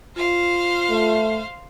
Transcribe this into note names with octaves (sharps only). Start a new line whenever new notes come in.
F4 C5 F5
A3